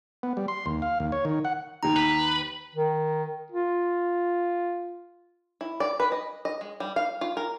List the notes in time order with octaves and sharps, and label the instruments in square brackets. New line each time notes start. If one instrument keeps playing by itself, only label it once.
[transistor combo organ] B3
G3
C6
D#2
F5
D#2
C#5
D#3
F#5
[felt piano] D#2 D#3 [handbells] A#5
[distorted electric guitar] B4
[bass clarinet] D#3
F4
[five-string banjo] E4
D5
B4
D#5
D#5
G#3
G3
F5
F4
A#4